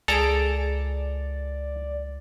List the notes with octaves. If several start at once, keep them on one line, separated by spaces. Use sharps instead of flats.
C#2 G#4 A4 D5 A5 A#5 D7